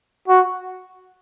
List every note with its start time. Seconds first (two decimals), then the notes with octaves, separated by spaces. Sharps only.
0.28 F#4